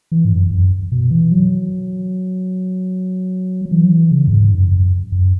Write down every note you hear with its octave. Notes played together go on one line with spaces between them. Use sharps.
E3
G#2
F#2
F#2
B2
E3
F#3
F#3
E3
F#3
E3
C#3
F#2
G#2
F#2
F#2
F#2